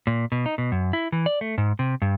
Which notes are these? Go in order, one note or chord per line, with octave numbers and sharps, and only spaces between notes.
A#2
B2
D#4
B2
F#2
E4
E3
D5
A3
G#2
C3
G2